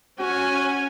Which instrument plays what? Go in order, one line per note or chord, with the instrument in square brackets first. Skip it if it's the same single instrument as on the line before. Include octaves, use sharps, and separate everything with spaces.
[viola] C#4 G#5 [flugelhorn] F#4